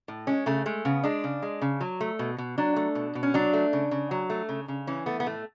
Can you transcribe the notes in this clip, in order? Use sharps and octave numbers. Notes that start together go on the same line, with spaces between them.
A2
G#3 C#4
C#3 A3
G#3 A3
C#3 B3
G#3 D4
C#3
G#3
C#3
F#3
A3
B2
B2
F#3 D4
A3
B2
B2
C#4
F#3 D4
A3
C#3
C#3
F#3
A3
C#3
C#3
E3 C#4
A3 B3
B3
A2 A3